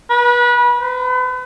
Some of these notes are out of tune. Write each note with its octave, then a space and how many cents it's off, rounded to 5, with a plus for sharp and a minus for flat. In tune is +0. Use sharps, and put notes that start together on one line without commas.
B4 -30
B4 +35